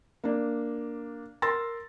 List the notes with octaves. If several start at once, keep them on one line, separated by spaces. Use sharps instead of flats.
A#3 D4
A#4 C6 E6 A6 A#6